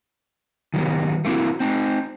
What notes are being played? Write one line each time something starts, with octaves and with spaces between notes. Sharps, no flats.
D#3 F#3 G3 B3
A3 A#3 C4 E4 F#4
C4 D#4